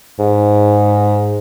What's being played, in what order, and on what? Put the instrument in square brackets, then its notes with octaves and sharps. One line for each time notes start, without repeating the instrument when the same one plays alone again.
[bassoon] G#2